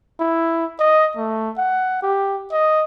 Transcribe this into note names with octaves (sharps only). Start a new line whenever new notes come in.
E4
D#5
A3
F#5
G4
D#5